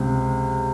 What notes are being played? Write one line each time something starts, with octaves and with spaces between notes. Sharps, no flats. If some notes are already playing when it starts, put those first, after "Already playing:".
Already playing: C#2 C3